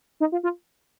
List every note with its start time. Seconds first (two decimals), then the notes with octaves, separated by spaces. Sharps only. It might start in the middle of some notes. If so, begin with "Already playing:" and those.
0.20 D#4
0.32 F4
0.43 F4